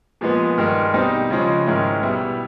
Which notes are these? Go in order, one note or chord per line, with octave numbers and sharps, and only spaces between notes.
A#2 F3 G#3 B3
G2 D#3 G#3
B2 G3 C4 D#4
C#3 F3 G#3 C#4
G#2 D#3 G#3 C#4 E4
B2 G3 B3 E4